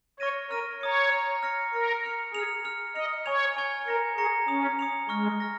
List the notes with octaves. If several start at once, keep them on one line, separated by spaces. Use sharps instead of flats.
C#5 C#6 F6 A#6 D#7
A#4 C#6 F6 A#6 D#7
C#5 A#5 D#6 C#7
A#5 D#6 C#7
F6 A#6 C#7
A#4 F6 A#6 C#7
F6 C#7 F7
G#4 F6 C#7 F7
F6 C#7 F7
D#5 F6 C#7 F7
C#5 G#5 C#6 G#6 F7
G#5 C#6 G#6 F7
A#4 A#5 C#6 A#6 C#7
G#4 A#5 C#6 A#6 C#7
C#4 D#6 C#7 F7
D#6 C#7 F7
G#3 C#6 F6 A#6
F6 A#6